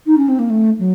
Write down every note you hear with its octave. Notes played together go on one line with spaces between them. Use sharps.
D#4
C#4
C4
A#3
A3
F#3